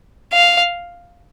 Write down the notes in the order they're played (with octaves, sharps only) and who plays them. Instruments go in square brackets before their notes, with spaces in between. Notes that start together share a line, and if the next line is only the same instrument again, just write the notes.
[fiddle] F5